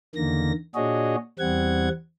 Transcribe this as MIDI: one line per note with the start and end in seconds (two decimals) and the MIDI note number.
0.16 0.52 40
0.16 0.52 50
0.16 0.52 51
0.16 0.52 58
0.16 0.52 94
0.75 1.16 46
0.75 1.16 62
0.75 1.16 66
0.75 1.16 68
0.75 1.16 73
0.75 1.16 75
1.39 1.89 40
1.39 1.89 55
1.39 1.89 60
1.39 1.89 78
1.39 1.89 92